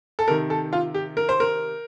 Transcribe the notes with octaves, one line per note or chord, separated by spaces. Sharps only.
A4
C3 D#3 A#4
A4
F4
G4
A#4
C5
A#4